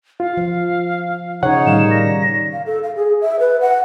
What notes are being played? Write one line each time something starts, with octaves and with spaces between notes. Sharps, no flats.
F4 F5
F3
C#3 D#4 C#5 F#5
A2 D#3 G3 F5 E7
A#6
F5
A4
F5
G#4
E5
B4
F#5